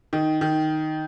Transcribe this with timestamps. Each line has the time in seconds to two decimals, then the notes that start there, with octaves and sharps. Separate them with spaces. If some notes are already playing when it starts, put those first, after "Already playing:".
0.13 D#3
0.41 D#3